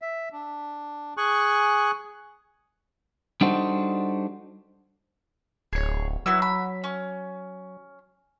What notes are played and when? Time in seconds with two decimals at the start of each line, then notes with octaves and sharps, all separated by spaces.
0.02 E5
0.33 D4
1.17 G#4 G#5 C#6 F#6
3.41 G3 D4 D#4 F#4 A4 C5
5.73 D1 G#4 C#5
6.26 F#3 B3 E4 E6
6.42 B5
6.84 C#4